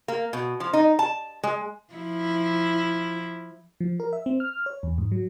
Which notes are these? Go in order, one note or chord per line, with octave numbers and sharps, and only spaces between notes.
A#3
B2
F3
D#4
A5
G#3
F3 E4
F3
A#4
E5
C4
F6
C#5
E2
G#2
F#3